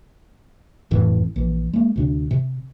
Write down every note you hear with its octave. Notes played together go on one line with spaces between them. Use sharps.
G1 F2 A2 E3
A#1 E3
G#3 A#3
D2 C3 D4
C3